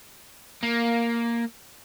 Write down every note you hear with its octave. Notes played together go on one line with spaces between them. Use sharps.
A#3